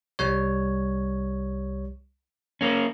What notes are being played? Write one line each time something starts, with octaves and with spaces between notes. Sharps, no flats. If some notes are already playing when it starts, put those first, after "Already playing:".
C2 G3 C#5
A#3 C#4